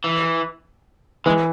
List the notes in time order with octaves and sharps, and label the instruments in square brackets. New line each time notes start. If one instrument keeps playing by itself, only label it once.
[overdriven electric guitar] E3
[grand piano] E3 [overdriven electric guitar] G#3